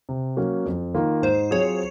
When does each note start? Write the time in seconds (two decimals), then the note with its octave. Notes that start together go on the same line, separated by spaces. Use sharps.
0.09 C3
0.37 F#3 A#3 C#4 F#4
0.65 F2
0.95 D#3 A#3 F4
1.22 G#2 C5
1.51 F#3 C4 F4 G#4 C#5